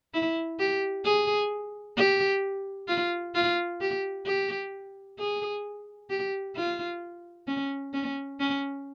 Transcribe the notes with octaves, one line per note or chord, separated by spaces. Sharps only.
E4
G4
G#4
G4
F4
F4
G4
G4
G#4
G4
F4
C#4
C#4
C#4